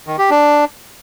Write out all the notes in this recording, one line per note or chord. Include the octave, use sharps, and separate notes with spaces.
D#3
G4
D4